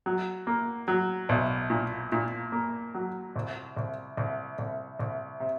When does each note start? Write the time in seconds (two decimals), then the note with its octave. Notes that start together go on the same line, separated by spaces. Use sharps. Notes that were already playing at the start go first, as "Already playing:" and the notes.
0.06 F#3
0.47 A#3
0.88 F#3
1.29 B1
1.70 A#2
2.12 A#2
2.52 A#3
2.94 F#3
3.36 C2
3.77 C2
4.17 C2
4.59 C2
4.99 C2
5.40 C3